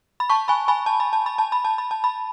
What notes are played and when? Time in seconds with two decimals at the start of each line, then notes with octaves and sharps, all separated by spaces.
0.20 B5
0.30 A5 C#6
0.48 G#5 B5
0.68 G#5 B5
0.86 A5
1.00 B5
1.13 A5
1.26 B5
1.38 A5
1.52 B5
1.65 A5
1.78 B5
1.91 A5
2.04 B5